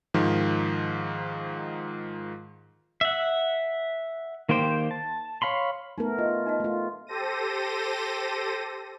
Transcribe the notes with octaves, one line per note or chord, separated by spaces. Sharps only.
G#2 D#3 F3
E5 F#5
D#3 A#3 G4 C5 G5
A5
C#5 F5 B5 C6
A3 B3 D#4 A#4
F4 D#5
D#4 D#5 F5
A3 F4
G4 A4 C5 A#6 D#7